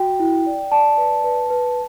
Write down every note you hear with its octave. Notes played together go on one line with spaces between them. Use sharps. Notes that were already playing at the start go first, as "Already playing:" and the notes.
Already playing: F#4 G5
E4
D5
D5 A5
B4
B4
B4